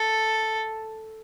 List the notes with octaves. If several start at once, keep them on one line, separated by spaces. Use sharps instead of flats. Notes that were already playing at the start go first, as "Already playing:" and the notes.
Already playing: A4